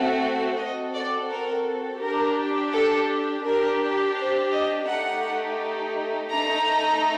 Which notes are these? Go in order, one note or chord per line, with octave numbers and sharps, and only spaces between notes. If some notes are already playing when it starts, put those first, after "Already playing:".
Already playing: A3 C4 F#4 A4
C4 F#4 A4 D#5
D5
A#4
D4 G4 A#4
A4
D4 G4 A#4
C5
D#5
A3 D#4 G4 F#5
A3 D#4 A4 A#5